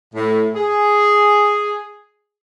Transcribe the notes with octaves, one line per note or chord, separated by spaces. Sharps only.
A2
G#4